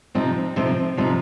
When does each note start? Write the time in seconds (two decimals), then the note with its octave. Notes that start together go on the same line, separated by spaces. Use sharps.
0.15 C3 F3 C4 D#4
0.56 C3 F3 C4 D#4
0.97 C3 F3 C4 D#4